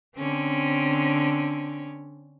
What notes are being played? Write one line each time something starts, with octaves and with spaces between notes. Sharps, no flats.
D3 C4 C#4